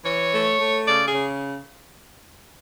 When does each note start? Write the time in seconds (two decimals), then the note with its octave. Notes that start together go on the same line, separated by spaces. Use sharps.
0.04 E3 C#5
0.32 A3
0.60 A3
0.87 C#3 D5
1.08 G#4
1.14 C#3